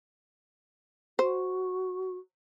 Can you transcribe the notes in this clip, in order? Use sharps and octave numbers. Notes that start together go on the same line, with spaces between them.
F#4 C5